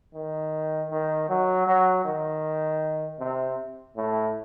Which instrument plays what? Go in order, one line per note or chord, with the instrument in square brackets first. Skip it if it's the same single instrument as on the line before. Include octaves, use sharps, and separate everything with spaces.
[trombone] D#3
D#3
F#3
F#3
D#3
C3
A2